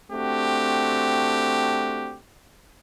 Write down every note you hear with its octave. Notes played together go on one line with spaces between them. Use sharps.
A3 C4 D4 F#4 G4